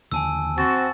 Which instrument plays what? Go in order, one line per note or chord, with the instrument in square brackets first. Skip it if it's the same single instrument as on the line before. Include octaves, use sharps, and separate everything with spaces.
[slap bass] D#2 D3 F3 [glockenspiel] G#5 A5 E6
[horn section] C4 F#4 [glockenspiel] A6